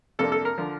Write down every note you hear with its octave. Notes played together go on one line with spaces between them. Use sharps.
F2 C3 F3 A#3 D4 A4
A4
A#4
D3 F3